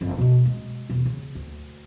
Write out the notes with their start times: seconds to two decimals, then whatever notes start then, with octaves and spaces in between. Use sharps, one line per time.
0.01 F#1 F2
0.18 B2 G#3
0.45 G#3
0.90 E2 B2
1.06 C#3
1.35 D2